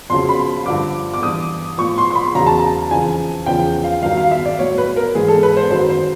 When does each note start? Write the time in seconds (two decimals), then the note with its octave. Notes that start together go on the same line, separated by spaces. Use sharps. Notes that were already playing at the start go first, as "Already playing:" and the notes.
0.10 F2 C#3 F#3 C6
0.29 B5
0.66 G2 D3 F3 D6
1.14 D6
1.22 G2 E3 D#6
1.78 A2 F3 C#6
1.98 C6
2.11 C6
2.15 B5
2.35 E2 C#3 F#3 A#5
2.46 A5
2.60 A#5
2.91 F2 C#3 E3 G#5
3.46 E2 C#3 F3 G5
3.84 F5
4.03 G2 D#3 F#3 F5
4.17 F5
4.31 E5
4.45 D5
4.59 A2 F#3 C#5
4.78 B4
4.96 A#4
5.15 G#2 E3 G#4
5.28 A4
5.43 B4
5.57 C5
5.70 F#2 D#3 F#3 C5
5.89 C5